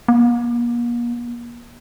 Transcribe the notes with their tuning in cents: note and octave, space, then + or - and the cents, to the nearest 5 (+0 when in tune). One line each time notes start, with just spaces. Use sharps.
A#3 +40